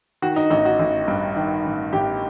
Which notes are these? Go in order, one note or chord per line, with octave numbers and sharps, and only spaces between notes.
D#3 F#4
D#4
A1 D#4
F#4
A1
G2
D#3
A1
A1 G4